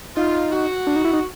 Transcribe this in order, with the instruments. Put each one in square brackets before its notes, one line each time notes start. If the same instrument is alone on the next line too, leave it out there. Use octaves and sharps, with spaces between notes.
[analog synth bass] D#4 [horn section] F4
[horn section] F#4
[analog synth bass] D4
D#4
E4
D#4